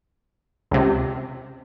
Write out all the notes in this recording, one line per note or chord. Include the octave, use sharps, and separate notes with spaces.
C#2 C3